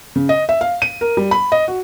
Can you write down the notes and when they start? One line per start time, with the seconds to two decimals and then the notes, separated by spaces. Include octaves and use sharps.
0.16 C#3
0.29 D#5
0.49 E5
0.61 F5
0.82 D#7
1.01 A#4
1.17 G3
1.31 B5
1.52 D#5
1.68 F#4